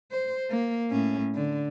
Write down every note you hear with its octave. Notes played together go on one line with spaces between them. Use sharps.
C5
A#3
A2 C#4
D3